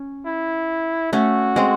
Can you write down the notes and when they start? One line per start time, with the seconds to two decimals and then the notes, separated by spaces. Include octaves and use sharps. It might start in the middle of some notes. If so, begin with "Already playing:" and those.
Already playing: C#4
0.26 E4
1.13 A3 C#4 F#4
1.56 G#3 C4